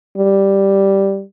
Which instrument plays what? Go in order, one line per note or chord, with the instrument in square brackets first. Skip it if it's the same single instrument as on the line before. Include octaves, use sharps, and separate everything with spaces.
[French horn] G3